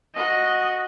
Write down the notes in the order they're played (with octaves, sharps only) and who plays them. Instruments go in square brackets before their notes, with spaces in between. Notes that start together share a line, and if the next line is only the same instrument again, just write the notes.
[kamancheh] F#4 [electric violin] D#5